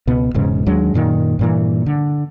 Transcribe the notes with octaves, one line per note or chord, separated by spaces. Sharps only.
C#2 B2 B3
E1 G#2 C#3
D#2 F#3 G#3 D4
F#2 A#2 D#3
G2 A#2 E3
D3